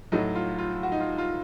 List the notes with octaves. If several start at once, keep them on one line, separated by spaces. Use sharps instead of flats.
A2 F#3 A3 D#4
F4
F4
F#4
D#4
F4
F4